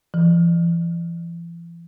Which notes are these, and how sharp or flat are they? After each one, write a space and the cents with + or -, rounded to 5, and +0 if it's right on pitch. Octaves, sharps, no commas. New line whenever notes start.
E3 +40